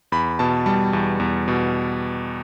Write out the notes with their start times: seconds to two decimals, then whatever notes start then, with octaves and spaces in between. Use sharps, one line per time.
0.12 E2 B5
0.39 B2 A5
0.66 G3 A5
0.93 E2
1.20 E2
1.48 B2